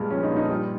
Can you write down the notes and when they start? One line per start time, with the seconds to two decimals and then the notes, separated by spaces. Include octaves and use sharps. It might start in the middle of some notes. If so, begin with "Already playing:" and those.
Already playing: G2 A#2 G#3
0.10 F3 C#4
0.23 D#4
0.30 A#2
0.36 D#4
0.49 G3 F4